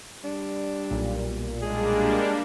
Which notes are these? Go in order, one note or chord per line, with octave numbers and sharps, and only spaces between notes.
G3 D4
B1 A#2
G3 G#3 A#3 D4 G#4